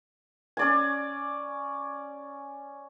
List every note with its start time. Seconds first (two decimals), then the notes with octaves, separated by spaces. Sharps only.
0.57 C#4 D5 G#5